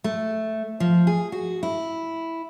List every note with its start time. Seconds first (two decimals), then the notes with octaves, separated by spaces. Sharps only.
0.04 A3
0.80 F3
1.07 G#4
1.32 F#4
1.63 E4